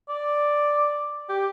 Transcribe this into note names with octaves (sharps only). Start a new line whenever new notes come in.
D5
G4